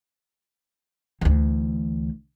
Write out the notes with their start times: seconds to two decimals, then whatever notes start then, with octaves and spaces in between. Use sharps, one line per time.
1.21 D2 E3